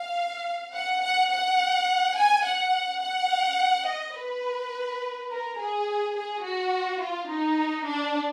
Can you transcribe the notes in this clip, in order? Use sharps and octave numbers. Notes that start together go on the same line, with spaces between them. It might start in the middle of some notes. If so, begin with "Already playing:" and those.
Already playing: F5
F#5
F#5
F#5
G#5
F#5
F#5
D#5
B4
A#4
G#4
G#4
F#4
F4
D#4
D4